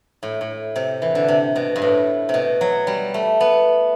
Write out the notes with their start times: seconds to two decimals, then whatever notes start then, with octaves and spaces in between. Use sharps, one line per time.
0.23 A2
0.41 A2
0.76 C3
1.02 E3
1.15 D3
1.28 C3
1.56 B2
1.76 G2
1.82 A2
2.29 C3
2.34 B2
2.61 F#3
2.87 G3
3.14 A3
3.41 B3